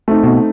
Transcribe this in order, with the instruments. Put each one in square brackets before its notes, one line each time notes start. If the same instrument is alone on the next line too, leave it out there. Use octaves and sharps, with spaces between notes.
[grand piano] A3 C4 D#4
[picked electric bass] B2